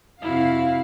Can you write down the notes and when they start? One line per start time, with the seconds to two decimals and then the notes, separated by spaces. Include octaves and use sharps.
0.22 F2 C3 E4 F#4 F5